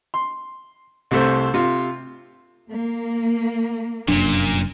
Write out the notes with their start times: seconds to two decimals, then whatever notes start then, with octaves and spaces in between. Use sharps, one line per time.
0.14 C6
1.11 C2 C3 A3 A4 C5
1.54 C3 F4
2.69 A#3
4.08 F1 F#2 A#2 D4